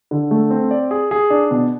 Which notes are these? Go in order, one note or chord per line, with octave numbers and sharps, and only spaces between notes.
D3
A3
C4
D5
G#4
G#4
D4
B2